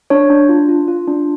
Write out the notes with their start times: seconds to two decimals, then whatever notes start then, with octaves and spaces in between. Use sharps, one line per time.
0.10 D4 C#5
0.30 D4
0.49 F4
0.69 F4
0.88 F4
1.08 D4